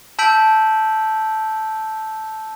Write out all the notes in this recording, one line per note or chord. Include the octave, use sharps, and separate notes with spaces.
A5 E6 G6 B6 D7 F#7